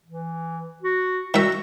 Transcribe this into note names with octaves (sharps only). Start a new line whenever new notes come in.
E3
F#4
D#3 F#4 E5